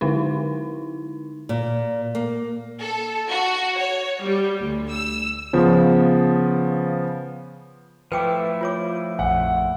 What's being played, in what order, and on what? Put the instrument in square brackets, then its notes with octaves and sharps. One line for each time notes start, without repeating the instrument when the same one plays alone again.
[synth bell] D3 G#3 D#4 E4
[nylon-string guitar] A#2
A#3
[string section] A4
F#4
C#5
G3
D2
E6
[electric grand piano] C#3 F3 B3
[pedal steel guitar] F3 A3 E4 [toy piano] B4 G5 D6
[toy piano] F4 C#5 D6
[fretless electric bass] A#1 F2 [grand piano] F#5